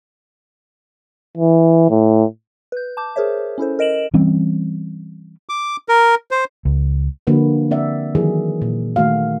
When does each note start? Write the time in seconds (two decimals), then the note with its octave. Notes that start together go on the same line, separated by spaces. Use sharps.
1.37 E3
1.90 A2
2.72 B4 G6
2.97 A5 D6 G6
3.16 G#4 A#4 C5 C#5 E5
3.58 C#4 E4 A4 C5
3.79 A#4 D#5 D7 E7 F#7
4.14 E3 G3 C4 C#4
5.49 D6
5.89 A#4
6.31 C5
6.65 C#2
7.27 D3 F3 A#3 F#4 B4
7.71 C4 D5 E5 F#5
8.15 D#3 E3 F#3 G#4
8.62 A#2
8.96 D#3 A3 F#4 F5